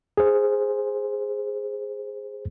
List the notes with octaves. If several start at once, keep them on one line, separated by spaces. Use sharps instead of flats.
G#4 C5